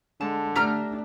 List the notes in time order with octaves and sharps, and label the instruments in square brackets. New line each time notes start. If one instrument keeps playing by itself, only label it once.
[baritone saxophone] D3 [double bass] G#3 [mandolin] A5
[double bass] A3 D4 [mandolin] G4 A#5 F6